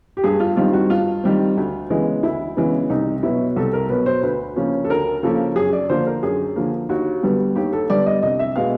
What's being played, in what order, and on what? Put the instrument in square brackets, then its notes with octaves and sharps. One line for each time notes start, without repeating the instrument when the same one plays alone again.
[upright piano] G4
G2 G#4
F4
D#3 G3 C4 F4
F#4
G2 F4
D#3 G3 C4
D2
C#3 E3 G#3 B3
D2 E4
C#3 E3 G#3 B3
C2 D#4
B2 F#3 B3 E4
C2 A4
A#4
B2 F#3 B3 B4
C5
D2 B4
C#3 F3 A#3 C#4
A4
D2 A#4
C#3 F3 A#3 C#4 A4
F#2 G#4
D5
D3 F3 A#3 C5
A#4
F#2 G#4
D3 F3 A#3
D#2 F#4
D3 G3 B3
D#2 G4
A4
D3 G3 B3 D5
D#5
C2 D#5
E5
B2 G#3 B3 F5